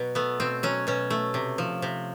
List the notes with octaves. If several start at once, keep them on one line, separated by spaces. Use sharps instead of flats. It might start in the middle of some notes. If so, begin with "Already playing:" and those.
Already playing: B2 F#3
A3 B3
B2 C4
F#3 C#4
B2 C#4
A3
C3
F3
C3